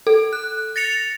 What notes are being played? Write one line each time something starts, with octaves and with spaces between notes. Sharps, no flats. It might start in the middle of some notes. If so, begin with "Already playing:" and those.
A4
F#6
A6 A#6 C#7 F7